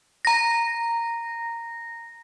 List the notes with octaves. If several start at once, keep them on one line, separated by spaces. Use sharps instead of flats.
A#5 A#6